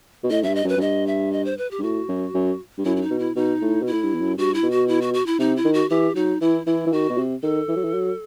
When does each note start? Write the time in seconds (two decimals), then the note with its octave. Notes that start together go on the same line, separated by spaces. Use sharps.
0.23 B2
0.31 A2 D#5
0.43 F#2 E5
0.47 G2
0.55 D#5
0.65 F#2
0.69 B4
0.77 F#2
0.81 G2 D#5
1.07 E5
1.33 D#5
1.45 C5
1.58 B4
1.71 G4
1.79 G2
1.83 A2 F#4
2.08 F#2
2.34 F#2
2.78 G2
2.85 F#2 E4
2.97 E4
3.02 D#4
3.10 B2
3.19 E4
3.36 B2 D#4
3.61 A2
3.82 B2 E4
3.93 A2
4.03 G2
4.14 E2
4.21 F#2
4.37 G2 F#4
4.54 E4
4.63 B2
4.71 F#4
4.88 E4
5.02 F#4
5.14 F#4
5.26 E4
5.39 C3 D#4
5.57 E4
5.65 D#3
5.74 F#4
5.90 E3 G4
6.15 F#3 D#4
6.41 E3 E4
6.66 E3 E4
6.87 E3
6.92 D#3 F#4
7.09 B2
7.18 C3
7.43 D#3 A4
7.68 E3
7.76 F#3
7.84 E3
7.94 F#3